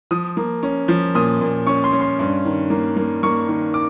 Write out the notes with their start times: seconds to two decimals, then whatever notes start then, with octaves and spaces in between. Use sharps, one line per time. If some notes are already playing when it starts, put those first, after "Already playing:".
0.11 F3 D#6
0.37 A#3
0.63 C#4
0.88 F3
1.15 A#2 D#6
1.41 A#2
1.67 C#4 C#6
1.84 C6
1.93 C#4
2.01 C6
2.19 G2
2.45 D#3
2.70 A#3
2.97 A#3
3.23 A#3 C#6
3.48 D#3
3.74 D6